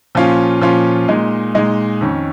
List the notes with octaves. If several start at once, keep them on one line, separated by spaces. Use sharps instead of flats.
A#2 F3 C#4 F4
A#2 F3 C#4 F4
A#2 G#3 D#4
A#2 G#3 D#4
F2 D#3 C#4